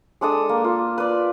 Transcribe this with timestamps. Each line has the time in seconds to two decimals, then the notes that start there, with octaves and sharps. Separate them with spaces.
0.21 G#3 D4 A4 D#6
0.49 A#3
0.64 F4
0.98 B4 D5